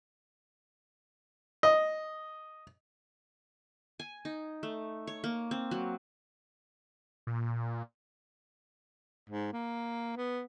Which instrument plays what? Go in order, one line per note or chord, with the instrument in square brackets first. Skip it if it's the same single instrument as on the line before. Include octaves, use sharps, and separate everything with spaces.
[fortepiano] D#5
[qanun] G#5
D#4
A3
C#5
A#3
C4
F#3
[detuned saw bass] A#2
[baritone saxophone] G#2
A#3
B3